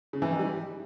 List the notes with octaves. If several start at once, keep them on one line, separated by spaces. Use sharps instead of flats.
C#3
E3
D#3
G3